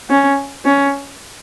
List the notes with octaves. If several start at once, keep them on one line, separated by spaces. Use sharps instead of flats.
C#4
C#4